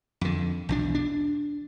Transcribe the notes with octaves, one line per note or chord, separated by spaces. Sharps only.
F2 D3
B1 E2 D4
D4